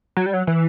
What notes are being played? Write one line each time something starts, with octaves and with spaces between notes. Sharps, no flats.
F#3
G3
F#3
E3